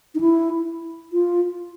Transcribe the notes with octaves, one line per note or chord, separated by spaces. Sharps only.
D#4
E4
F4